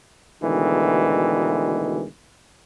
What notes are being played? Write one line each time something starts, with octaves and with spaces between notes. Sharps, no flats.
D2 B2 D#3 E3 G#3